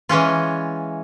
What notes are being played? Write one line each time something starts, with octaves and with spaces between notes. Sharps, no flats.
E3 G#3 C#4 F4